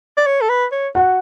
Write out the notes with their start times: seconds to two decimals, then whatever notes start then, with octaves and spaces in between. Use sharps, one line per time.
0.17 D5
0.26 C#5
0.42 A4
0.50 B4
0.72 C#5
0.95 F#4 F#5